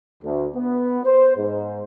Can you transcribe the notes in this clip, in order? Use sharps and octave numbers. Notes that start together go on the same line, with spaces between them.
D2
B3
C5
G#2